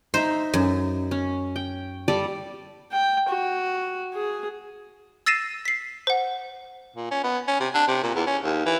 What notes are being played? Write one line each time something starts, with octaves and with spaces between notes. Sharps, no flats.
D#4 C5 E5
F#2
C#4
G5
G3 A4 D5
G5
F#4
G#4
E6 A6 A#6 C7 D#7 E7
B6 C7
C5 F#5
A#2
C#4
B3
C#4
C3
D4
C3
A#2
E2
C#4
D#2
E3